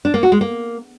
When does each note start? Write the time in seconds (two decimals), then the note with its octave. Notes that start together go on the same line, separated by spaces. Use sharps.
0.05 D4
0.14 A#3
0.23 F#4
0.32 G#3
0.41 A#3